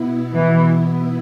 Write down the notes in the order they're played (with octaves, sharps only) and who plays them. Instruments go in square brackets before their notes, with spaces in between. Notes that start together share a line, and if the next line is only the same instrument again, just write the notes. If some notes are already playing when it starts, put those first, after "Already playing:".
Already playing: [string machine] B2 B3 E4
[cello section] E3